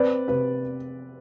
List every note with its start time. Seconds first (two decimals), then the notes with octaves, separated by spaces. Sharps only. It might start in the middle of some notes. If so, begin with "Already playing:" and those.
Already playing: C4 B4 D5
0.28 C3 B4